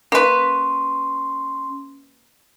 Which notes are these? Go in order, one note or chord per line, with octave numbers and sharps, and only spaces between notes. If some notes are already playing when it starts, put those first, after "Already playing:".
A#3 C#4 B4 C6